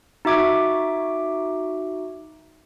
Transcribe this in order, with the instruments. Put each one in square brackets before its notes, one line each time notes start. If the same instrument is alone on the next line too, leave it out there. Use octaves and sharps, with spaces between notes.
[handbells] D#4 F#4 E5 D6 G#6 D7